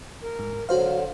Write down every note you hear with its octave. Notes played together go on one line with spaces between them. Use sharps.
A#4
G#2
D3 F#3 F#4 C5 F5